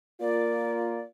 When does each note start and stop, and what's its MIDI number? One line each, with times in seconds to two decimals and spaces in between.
0.21 1.02 58
0.21 1.02 65
0.21 1.03 74